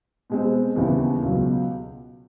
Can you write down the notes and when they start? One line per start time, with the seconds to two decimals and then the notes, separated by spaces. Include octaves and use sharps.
0.30 B2 G#3 C4
0.76 D#2 C#3 E3 G3 B3
1.22 C#2 B2 F#3